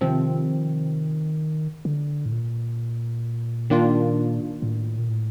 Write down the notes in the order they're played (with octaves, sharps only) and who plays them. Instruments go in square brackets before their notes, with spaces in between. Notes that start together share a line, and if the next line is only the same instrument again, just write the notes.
[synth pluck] C3 F3 C4 [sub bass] D#3
[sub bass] D3
A2
A#2
[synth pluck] D#3 A#3 D4 F4
[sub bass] A2
A#2
A2